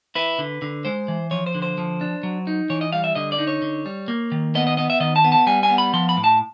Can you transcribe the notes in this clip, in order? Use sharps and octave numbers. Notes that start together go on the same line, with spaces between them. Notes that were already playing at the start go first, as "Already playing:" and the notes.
E4 B4
D3
D3
G#3 C5
E3
F3 C#5
C5
D3
C5
F3
D4
F#3
D#4
E3 C#5
D#5
G3 F5
E5
D3 D#5
D5
D#4
C#5
D3
G3
A#3
D#3
B3 D#5
D#5
B3 D#5
E5
D#3 D#5
A5
B3
A5
G3 G#5
G#5
B3
B5
F3 C6
B5
A2
A5